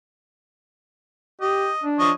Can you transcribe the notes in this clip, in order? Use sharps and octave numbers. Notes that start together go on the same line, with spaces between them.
G4 D#5
D4
F3 C#5 D#5